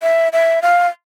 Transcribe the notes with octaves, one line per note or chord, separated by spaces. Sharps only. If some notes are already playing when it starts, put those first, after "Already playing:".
E5
E5
F5